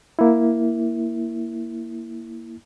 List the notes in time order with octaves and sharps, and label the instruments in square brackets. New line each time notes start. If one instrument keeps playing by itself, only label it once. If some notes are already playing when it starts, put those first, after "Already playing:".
[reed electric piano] A#3 E4